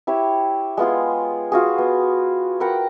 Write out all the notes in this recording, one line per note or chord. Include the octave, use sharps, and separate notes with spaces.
E4 G4 C#5
G#3 B3 F4 G#4
F4 F#4 G#4
B3
A#4 F#5 G5 B5